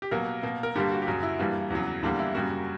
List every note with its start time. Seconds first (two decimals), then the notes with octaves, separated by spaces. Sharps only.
0.02 G4
0.11 B2 F#3 A#3 A#4
0.43 B2 A#3
0.63 A#4
0.75 G2 D3 G3 A#3 G4
0.92 F#4
1.02 G4
1.07 F#2 C#3 F#3 F#4
1.23 E4
1.39 G2 E3 G3 A#3
1.70 E2 C#3 F#3
2.02 E2 D3 G3 A#3 D4
2.19 E4
2.34 F#2 C#3 G3 A#3 F#4